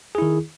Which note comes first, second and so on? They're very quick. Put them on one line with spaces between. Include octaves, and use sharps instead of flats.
G#4 E4 D#3